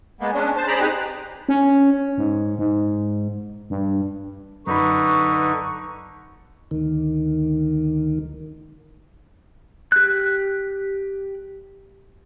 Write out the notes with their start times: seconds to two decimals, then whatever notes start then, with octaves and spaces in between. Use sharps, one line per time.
0.21 G#3 A#3 B3
0.34 G#3 C#4 D4
0.56 C5 A5
0.67 G#4 C5 D5 A#5 B5
0.80 C4 D#4 G4 G#4 B4
1.49 C#4
2.18 G#2
2.58 G#2
3.70 G2
4.67 F#2 D3 D#4 B4 B5 C#6
6.71 D2 D#3
9.92 G4 F#6